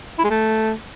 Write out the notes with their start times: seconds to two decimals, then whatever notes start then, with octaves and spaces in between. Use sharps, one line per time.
0.19 E4
0.24 G#3
0.30 A3